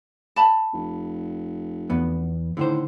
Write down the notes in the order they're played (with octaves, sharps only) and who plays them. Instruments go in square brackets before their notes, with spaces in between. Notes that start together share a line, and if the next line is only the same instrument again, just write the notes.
[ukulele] A5 B5
[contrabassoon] F1
[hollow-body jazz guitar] E2 B3
[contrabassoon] A2 [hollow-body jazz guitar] D3 D#3 C5